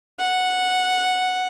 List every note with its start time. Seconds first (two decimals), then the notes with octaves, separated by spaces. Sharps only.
0.20 F#5